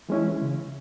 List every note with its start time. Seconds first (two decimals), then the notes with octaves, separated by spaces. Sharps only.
0.09 E3 G#3 C#4 E4
0.42 C#3